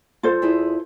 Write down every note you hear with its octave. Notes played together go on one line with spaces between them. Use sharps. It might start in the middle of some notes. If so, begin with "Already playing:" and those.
G2 F4 A4 C5
E2 E4 G#4